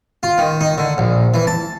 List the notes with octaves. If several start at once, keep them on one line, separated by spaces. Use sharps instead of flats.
F4
D#3
D#4
D3
A#1
E3
A5